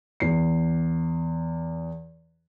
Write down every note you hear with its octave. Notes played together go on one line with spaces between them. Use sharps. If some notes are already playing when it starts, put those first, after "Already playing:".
E2 C7